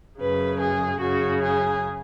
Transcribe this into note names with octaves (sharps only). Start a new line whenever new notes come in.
F#2 C#3 B4
G#4
F#2 C#3 F#4
G#4